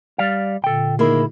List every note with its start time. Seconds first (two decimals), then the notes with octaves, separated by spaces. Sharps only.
0.18 G3 D5 F5
0.64 A#2 D3 A4 G5
0.99 D#3 A#3 E4 G#4